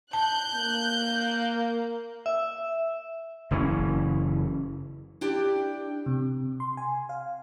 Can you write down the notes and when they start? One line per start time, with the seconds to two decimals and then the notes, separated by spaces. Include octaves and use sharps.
0.13 A5 F#6 G6
0.54 A#3
2.26 E5
3.51 F#1 E3 C#4
5.21 D4 E4 G4 D5 G5
6.06 C3
6.60 C6
6.77 G#5
7.09 F5